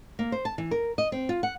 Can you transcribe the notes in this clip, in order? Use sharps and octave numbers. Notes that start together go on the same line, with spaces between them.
A#3
C5
A5
E3
A#4
D#5
C4
F4
F#5